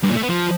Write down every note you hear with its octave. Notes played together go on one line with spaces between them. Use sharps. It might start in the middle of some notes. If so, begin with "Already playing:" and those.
G2
A#2
A3
B3
F3